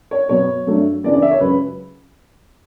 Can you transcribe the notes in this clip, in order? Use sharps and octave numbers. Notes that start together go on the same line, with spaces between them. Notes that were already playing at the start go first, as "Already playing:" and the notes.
C#5
B2 F#3 B3 C#5
G2 F#3 A3 D4
C#3 E3 B3 D4 D5
D5
E5
C#5
C#2 C#3 F#3 B4